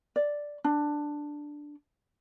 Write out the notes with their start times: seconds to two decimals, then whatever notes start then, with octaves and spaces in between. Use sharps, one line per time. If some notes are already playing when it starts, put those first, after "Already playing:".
0.16 D5
0.64 D4